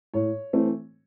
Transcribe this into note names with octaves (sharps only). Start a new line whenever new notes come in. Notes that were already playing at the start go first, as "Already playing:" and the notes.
A2 C#5
E3 A3 C4